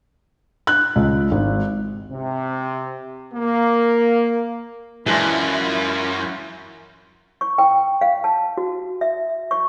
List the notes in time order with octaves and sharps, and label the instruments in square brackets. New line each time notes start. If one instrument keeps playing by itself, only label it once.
[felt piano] F#6
C#2
G#1
[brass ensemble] C3
A#3
[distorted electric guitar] F#2 [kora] E3 G#3 D4 [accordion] E4 F4
[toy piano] C#6
G5
F5
A5
F#4
E5
C#6